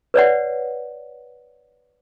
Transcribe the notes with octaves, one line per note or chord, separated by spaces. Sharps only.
B4 C#5 D5 F#5